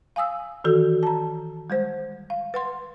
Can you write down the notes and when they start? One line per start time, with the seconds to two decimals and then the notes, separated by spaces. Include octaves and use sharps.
0.16 F5 G#5 D#6 E6
0.64 D#3 E3 F#4 A4
1.03 A5 A#5
1.70 G3 G#3 C5
2.30 F5
2.54 B4 F#5 C6